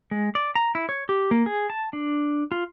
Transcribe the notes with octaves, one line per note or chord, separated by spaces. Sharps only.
G#3
D5
A#5
E4
C#5
G4
A#3
G#4
A5
D4
F4